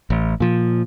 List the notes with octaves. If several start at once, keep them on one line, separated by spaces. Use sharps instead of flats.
A1
A#2 F3